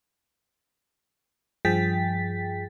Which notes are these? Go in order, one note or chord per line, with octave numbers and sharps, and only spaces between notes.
G2 F3 G#4 G5 A6 B6